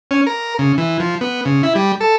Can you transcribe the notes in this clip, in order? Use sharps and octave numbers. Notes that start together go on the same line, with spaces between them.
C#4
A#4
C#3
E3
F3
B3
C#3
E4
G3
A4